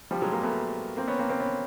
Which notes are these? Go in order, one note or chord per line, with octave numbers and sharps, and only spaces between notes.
F3 G3
F#3 G#3
G#3 A#3
A3 B3
A#3 C4
B3 C#4
A#3 C4
A#3 C4
B3 C#4